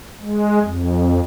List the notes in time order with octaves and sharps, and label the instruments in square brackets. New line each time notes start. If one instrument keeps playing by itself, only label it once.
[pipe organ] G#3
F2